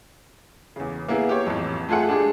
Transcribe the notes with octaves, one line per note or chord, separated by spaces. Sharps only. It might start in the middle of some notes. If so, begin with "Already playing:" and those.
E2 C#3
A#3 B3 E4 G#4
G4 C#5
A1 F2
A3 F4 G#4 A4 F#5
G#3 D4 G4 G#4